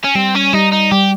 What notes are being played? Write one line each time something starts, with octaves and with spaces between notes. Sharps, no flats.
C#4
G3 C4
C#4
G3 D#4
D#4
G3 G4